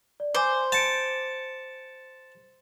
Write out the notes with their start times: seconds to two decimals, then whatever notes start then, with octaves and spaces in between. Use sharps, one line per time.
0.20 D5
0.35 C5 G#5 D6 G6
0.72 A5 A6 C#7 D7